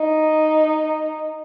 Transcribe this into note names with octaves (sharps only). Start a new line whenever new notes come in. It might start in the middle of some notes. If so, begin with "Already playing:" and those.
Already playing: D#4